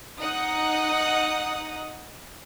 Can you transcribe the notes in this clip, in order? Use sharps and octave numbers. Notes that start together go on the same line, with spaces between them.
D#4 D#5 F#5 D#6